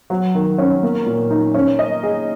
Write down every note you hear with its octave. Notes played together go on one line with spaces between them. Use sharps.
F#3
D#3
C#4
A#3
A#2
D#4
C#4
D#5
G#4